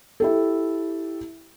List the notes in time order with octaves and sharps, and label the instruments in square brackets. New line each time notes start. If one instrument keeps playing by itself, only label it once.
[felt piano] E4 G4 A4